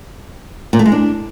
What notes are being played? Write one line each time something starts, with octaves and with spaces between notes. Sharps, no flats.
A#2
A3
G#3
D4